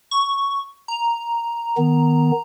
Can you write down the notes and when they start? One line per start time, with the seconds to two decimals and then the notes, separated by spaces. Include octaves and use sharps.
0.11 C#6
0.88 A#5
1.77 D#3 B3